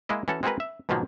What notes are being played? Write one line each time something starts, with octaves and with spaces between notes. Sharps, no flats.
G#3 A#3 E4 D#5
E3 C#4 F#4 A4
G#3 C4 F#4 G#4 A#4 B4
E5
G#2 B2 D#3 F3 F#3 A#3